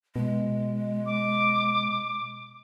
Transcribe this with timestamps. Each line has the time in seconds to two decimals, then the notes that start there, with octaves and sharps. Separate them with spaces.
0.16 B2 G#3
1.06 D6